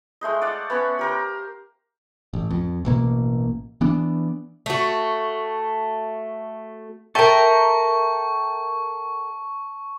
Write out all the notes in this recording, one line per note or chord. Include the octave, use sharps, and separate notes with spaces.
G#3 A3 C5 D#5
D5 F5 F#5 A5
B3 C#4 C#5
G4 A#4 C5
A1
F2
A1 B2 A#3
E3 B3 D4
A3 F#4
A4 A#4 E5 G5 A5 C#6 A6